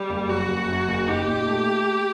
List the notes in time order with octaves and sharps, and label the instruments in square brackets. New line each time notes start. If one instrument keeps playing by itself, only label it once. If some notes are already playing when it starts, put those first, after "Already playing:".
Already playing: [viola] G3
[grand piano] F#1
[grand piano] F#3 [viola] F#4
[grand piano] F#1
F#2
F#1
[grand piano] D#4 [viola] G4
[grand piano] A#2
A3